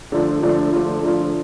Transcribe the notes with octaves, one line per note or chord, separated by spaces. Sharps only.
D3 F3 A3 D4 F4
D3 F3 A3 D4 F4
D3 F3 A3 D4 F4
D3 F3 A3 D4 F4